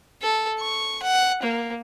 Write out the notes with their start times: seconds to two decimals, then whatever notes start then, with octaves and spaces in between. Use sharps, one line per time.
0.22 A4
0.60 C#6
1.02 F#5
1.43 A#3